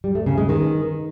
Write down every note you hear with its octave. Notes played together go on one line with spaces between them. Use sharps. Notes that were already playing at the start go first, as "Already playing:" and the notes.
G3
A3
C#3
G#3
D#3